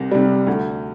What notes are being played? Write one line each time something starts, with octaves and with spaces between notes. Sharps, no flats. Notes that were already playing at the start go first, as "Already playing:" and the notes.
Already playing: C2 C3
C3 G3
D2